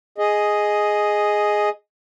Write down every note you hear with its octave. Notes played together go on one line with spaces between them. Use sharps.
G#4 D#5